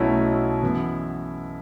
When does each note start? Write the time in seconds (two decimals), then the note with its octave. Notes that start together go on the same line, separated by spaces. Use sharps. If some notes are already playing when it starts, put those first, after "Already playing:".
Already playing: B1 B2 F#3 A3 C#4 E4
0.63 F#2 E3 B3